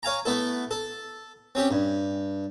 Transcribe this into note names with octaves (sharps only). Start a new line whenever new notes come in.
C#5 F5 G#5 A#5
A3 B3 E4 A4
A4
C4 C#4 G4
G2